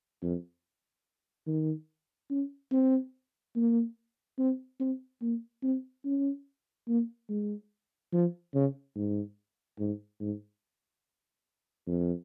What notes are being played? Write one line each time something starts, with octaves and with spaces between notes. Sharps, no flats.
F2
D#3
C#4
C4
A#3
C4
C4
A#3
C4
C#4
A#3
G#3
F3
C#3
G#2
G#2
G#2
F2